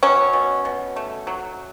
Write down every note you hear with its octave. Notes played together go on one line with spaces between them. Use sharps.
F#3 C#4
B2
B2
A3
F#3